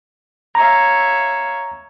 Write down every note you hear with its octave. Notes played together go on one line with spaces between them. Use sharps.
C#5 E5 F5 A#5